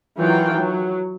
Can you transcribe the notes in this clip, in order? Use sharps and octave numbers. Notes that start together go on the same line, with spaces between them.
D#3 E3 F#3 F4 F#4 G5
F#3